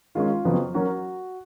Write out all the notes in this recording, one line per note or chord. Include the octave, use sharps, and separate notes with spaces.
D#3 G#3 C#4 F4
F2 C#3 F#3 B3
F#3 A#3 C#4 F#4